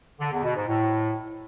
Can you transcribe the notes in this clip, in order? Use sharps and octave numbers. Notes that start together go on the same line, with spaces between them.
D3
E2
B2
G#2
A2